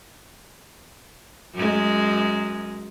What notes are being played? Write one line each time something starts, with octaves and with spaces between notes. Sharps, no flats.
F#2 G#3